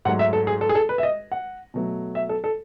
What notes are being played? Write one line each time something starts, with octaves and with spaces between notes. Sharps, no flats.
G#2 F#3 A3 F#5
E5
A4
G#4
A4
G#4
A4
B4
E5
D#5
F#5
B2 F#3 A3
E5
A4
A4